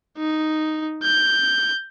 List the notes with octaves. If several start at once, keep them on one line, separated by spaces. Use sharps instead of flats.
D#4
G6